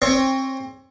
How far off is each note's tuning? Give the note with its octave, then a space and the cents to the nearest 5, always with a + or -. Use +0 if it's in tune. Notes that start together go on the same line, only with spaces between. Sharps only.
C4 +25 C#5 +15